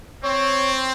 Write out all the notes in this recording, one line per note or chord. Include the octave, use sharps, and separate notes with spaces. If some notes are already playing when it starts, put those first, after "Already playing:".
C4 C#5